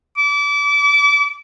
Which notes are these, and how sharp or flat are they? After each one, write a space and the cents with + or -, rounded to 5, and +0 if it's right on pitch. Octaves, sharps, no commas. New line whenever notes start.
D6 -30